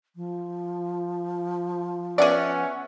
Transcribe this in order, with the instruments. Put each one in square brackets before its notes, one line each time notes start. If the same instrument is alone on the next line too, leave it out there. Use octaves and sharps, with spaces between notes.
[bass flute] F3
[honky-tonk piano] B3 E5 F#5 [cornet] C#4 [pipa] G#4 D5